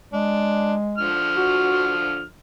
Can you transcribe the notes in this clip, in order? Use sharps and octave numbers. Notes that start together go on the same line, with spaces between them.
G#3 D4
D3 F3 F6
F#4